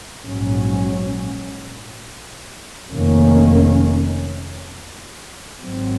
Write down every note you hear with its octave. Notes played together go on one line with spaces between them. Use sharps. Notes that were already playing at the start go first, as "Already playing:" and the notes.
A#1 G#2 F#3 C#4
F1 F2 D#3 A#3 C#4
G#1 G#2 F#3 C4